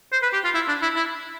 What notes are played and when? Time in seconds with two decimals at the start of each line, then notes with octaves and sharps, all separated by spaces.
0.12 C5
0.22 B4
0.33 G4
0.44 F4
0.55 E4
0.68 D4
0.82 E4
0.96 E4